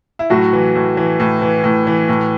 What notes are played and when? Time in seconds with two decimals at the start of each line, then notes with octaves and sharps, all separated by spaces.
0.19 E4
0.30 A2 F#3 F#4
0.53 E3
0.75 A2
0.97 E3
1.20 A2
1.42 E3
1.64 A2
1.87 E3
2.09 A2